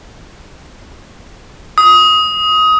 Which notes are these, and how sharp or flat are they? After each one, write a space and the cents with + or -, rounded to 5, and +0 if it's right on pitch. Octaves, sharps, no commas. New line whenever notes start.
D#6 +20